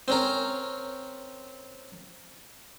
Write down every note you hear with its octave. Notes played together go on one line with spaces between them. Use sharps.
C4 C#4 A#4